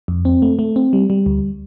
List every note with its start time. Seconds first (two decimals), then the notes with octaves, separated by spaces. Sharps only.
0.08 F2
0.25 C4
0.42 A3
0.59 A3
0.76 C4
0.93 G3
1.10 G3
1.26 D2